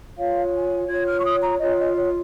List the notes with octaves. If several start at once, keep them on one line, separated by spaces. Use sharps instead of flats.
F4 C#5 F5
G#5
F4 C#5 G#6
F6
C#6
D#6
A#5
F4 C#5 D#5
D#5
C#5